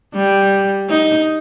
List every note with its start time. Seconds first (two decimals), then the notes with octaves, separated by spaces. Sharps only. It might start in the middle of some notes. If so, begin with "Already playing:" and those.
0.15 G3
0.90 D#4